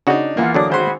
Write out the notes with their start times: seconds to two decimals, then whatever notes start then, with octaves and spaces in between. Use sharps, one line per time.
0.07 C#3 D4 D#4 F#4 F#5
0.37 E2 A#3 F4 F#5
0.54 D3 F#3 D4 D6 D#6
0.69 G#1 F#4 G#4 C5 B5 C6